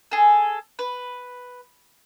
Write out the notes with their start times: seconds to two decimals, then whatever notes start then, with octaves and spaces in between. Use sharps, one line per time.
0.11 G#4 A4
0.79 B4